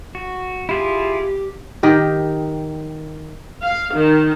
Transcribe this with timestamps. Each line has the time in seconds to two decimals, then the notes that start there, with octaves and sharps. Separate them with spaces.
0.15 F#4
0.69 E4 F4 G4 G#4
1.83 D#3 G4 D#5
3.62 F5
3.93 D#3